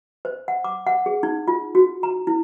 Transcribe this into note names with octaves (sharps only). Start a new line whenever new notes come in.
C5
F#5
D6
F#5
G#4
D#4
F4
F#4
A#5
E4